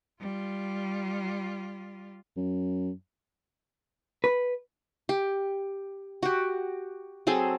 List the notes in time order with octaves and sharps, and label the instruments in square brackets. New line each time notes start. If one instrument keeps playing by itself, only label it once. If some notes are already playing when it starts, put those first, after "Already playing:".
[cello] G3 F4
[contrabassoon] F#2
[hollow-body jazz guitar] B4
[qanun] G4
F#4 G4
F#3 C4 G#4 A4